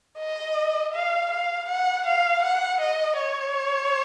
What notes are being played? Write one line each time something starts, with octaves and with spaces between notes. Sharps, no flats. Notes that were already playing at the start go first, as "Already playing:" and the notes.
D#5
F5
F5
F#5
F5
F#5
D#5
C#5